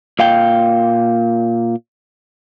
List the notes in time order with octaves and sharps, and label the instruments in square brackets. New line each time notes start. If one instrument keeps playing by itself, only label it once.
[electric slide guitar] A#2 F5 G5